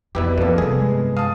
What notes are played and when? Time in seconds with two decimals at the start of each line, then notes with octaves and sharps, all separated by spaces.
0.15 F2 B2 E4 G4 B4 D5
0.38 F2 B2 F3 A#3 A4
0.58 G2 C3 B3 G#4
0.80 G#3
1.17 F5 A5 D#6